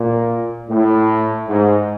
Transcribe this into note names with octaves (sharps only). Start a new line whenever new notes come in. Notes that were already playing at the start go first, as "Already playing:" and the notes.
Already playing: A#2
A2
G#2